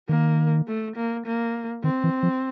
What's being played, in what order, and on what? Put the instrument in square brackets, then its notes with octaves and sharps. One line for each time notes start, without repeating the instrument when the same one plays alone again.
[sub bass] D#3 [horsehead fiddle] A#3
[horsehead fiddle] A3
A#3
A#3
[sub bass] D#3 [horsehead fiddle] C4
[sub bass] E3
F3